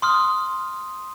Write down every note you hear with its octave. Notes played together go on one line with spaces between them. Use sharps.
C6 D#6 F6